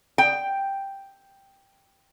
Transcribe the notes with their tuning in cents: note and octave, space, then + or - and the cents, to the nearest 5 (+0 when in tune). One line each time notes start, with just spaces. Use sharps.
G5 +0